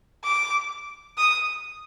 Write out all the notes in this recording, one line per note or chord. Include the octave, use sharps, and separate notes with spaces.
D6
D#6